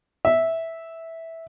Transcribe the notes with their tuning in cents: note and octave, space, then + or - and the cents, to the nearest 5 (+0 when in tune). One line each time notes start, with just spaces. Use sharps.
E5 -10